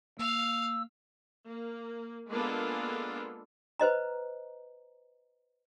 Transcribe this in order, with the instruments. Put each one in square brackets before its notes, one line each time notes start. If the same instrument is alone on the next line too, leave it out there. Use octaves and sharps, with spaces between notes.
[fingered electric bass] A#3 [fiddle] F5 F6 [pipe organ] E6
[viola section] A#3
G#3 A#3 B3 D4 F4 A4
[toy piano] B4 C5 D#5 A#5